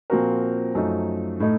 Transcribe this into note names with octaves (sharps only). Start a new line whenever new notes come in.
A#2 F3 C4 F#4 A#4
F#2 F3 A3 D#4
A2 A3 D#4